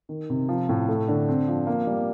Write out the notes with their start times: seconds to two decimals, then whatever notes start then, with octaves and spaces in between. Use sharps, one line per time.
0.09 D#3
0.30 C3
0.49 F3
0.69 A2
0.89 A3
1.08 D3
1.29 C4
1.48 F3
1.67 A#3
1.87 G3